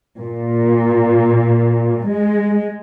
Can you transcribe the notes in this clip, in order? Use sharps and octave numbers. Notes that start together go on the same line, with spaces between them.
A#2
G#3